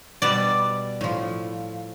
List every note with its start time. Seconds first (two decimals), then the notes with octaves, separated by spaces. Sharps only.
0.22 B2 G3 D5
1.01 A2 F3